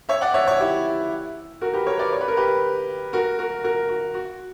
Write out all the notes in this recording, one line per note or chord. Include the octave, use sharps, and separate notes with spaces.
C#5 E5
D5 F#5
C#5 E5
C#5 E5
E4 G4
F#4 A#4
G4 B4
A#4 C#5
B4 D5
C#5
B4
A#4
G4 B4
F#4 A#4
F#4 A#4
F#4 A#4
F#4
F#4